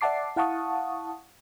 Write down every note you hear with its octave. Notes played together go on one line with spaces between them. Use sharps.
D5 E5 F#5 A5 D6 C7
E4 F5 F#5 A5 C#6 D#6